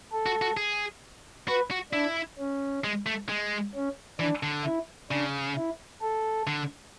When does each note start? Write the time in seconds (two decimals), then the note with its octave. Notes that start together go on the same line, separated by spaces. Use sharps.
0.12 A4
0.26 F#4
0.42 F#4
0.57 G#4
1.48 F#4 B4
1.71 F#4
1.92 D4 E4
2.38 C#4
2.84 G#3
3.06 A3
3.29 G#3
3.75 C#4
4.19 E3 D4
4.43 D3
4.65 E4
5.11 C#3 D4
5.57 E4
6.01 A4
6.47 D3